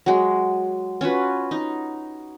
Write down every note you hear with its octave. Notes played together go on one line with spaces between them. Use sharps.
F#3 G#3
C#4 F4 F#4 B4
D#4